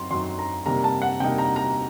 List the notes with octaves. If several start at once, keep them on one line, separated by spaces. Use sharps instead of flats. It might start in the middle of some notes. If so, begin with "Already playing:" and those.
Already playing: F#2 F#3 C4 D#4 C6
F#2 F#3 C4 D#4 C6
A#5
C3 G3 A#3 D#4 A#5
A5
F#5
C3 G3 A#3 D#4 G5
A#5
A#5